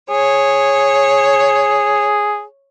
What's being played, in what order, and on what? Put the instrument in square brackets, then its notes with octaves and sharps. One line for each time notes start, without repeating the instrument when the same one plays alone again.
[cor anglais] G#4 [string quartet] C#5